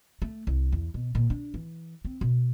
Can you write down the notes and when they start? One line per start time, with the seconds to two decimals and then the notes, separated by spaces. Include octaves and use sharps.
0.22 A3
0.47 C2
0.72 E2
0.94 B2
1.15 A#2
1.30 D4
1.54 E3
2.05 C4
2.21 B2